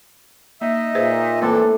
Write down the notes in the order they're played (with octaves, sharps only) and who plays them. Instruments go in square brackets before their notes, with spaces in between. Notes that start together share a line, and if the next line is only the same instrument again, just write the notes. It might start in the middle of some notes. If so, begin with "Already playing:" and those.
[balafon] A#3 [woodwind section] D#4 D#5 E5
[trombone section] A#2 [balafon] G#4 B4 C5
[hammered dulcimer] A2 C4 D4 [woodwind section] E3 A4 [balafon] A#3